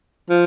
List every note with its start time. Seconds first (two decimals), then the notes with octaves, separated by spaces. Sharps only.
0.30 F3